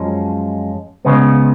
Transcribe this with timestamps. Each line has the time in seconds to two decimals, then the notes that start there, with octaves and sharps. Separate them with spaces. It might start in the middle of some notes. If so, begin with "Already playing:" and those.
Already playing: F#2 F3 G#3 C#4
1.05 C#2 C#3 G#3 B3